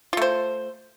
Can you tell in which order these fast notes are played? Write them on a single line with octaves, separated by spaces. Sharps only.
F4 A3 C5